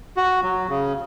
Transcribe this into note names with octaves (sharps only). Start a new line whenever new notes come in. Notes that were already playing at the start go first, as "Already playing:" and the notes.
F#4
F#3
C#3